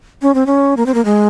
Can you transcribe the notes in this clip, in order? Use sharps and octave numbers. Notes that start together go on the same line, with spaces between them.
C#4
C4
C#4
A#3
C4
A#3
G#3